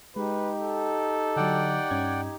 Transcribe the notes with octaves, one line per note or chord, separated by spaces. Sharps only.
G#3 D#4 G4 B4
A4
D3 F#3 D5 F#5 G5
G2 C#4 G#6